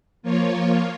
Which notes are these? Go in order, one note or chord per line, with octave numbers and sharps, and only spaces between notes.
F3 A#3 F4 C#5